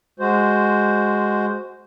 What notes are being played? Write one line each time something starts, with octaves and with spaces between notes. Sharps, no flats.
G#3 F#4 C5